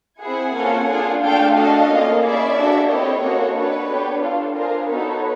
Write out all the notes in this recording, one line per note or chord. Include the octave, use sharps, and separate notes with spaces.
C4 E4 G#4 F#5 G#5
A#3 C#4 F4 A4
D4 F4 G#4
A3 D4 F4 A4 F5 G5
D4 F#4 A4 D#5 F5
A#3 C#4 F4
C#4 E4 G#4 D5 E5
A#3 D4 F#4 A4
C4 E4 G4 C#5 D#5
A#3 C#4 F#4 A4
D4 F#4 A4 B4 C#5
B3 D4 G4
D4 F4 A4
D4 F4 G#4 A#4 C5
B3 D#4 F#4 A4 B4 C#5